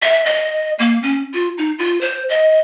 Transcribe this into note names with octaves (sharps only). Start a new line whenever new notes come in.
E5
D#5
A#3
C#4
F4
D#4
F4
C5
D#5